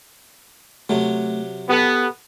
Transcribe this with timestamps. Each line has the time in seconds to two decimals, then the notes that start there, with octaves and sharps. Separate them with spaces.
0.89 C3 F#3 A3
1.69 B3 G4 A4